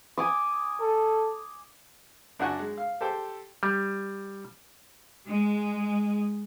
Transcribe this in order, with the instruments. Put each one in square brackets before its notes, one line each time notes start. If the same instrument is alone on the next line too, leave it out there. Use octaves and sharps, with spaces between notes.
[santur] G#5 D6 D#6
[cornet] A4
[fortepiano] F#2 D4 F#4 F#5 G#5 C#6
G#3
F5
G4 A4 C5 G5
[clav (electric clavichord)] G3
[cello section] G#3